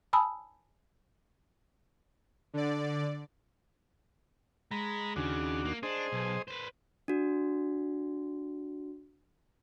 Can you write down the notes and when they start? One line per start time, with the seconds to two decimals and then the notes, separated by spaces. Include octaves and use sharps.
0.13 G#5 A5 B5 D#6 E6
2.54 D3 D5
4.71 G#3 A#5 B5
5.16 D#2 C#3 D4 F#4
5.65 A#3
5.83 D4 G#4 C5 D#5
6.13 B1
6.48 B4 C5
7.08 D4 F#4